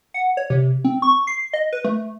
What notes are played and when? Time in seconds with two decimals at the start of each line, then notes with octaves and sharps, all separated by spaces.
0.14 F#5
0.37 C#5
0.50 C3
0.85 C4
1.02 C#6
1.27 C7
1.53 D#5
1.73 B4
1.85 A3